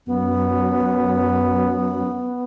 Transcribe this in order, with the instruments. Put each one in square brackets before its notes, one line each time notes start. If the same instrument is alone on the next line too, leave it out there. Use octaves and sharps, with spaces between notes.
[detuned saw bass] F#2 [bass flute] B3